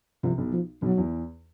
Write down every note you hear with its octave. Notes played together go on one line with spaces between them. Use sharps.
C2 C3 F3
B1 B2
F3
B1 B2 F#3
E2 E3